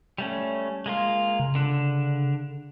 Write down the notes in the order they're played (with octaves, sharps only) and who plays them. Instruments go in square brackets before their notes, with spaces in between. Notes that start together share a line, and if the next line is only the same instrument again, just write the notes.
[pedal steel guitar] G3 A3 C#4
G#3 A#3 F4
[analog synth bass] C#3
[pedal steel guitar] D3 D4